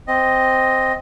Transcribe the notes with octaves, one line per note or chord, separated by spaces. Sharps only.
C4 D#5